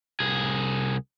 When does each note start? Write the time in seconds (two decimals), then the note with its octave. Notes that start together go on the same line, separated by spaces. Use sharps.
0.20 C2 G#4